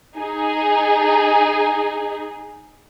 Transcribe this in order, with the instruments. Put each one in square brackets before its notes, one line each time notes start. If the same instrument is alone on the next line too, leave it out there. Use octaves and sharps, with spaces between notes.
[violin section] D#4 G#4